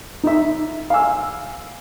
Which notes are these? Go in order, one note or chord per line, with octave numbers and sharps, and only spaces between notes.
D#4 E5
F5 G#5 E6